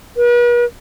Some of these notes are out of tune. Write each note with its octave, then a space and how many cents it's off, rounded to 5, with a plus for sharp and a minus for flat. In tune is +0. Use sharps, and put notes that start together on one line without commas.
B4 -45